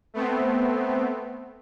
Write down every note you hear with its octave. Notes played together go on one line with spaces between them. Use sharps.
A3 B3 C4